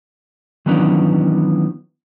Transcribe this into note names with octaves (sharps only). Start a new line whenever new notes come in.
D#3 E3 F#3 B3 C#4 D4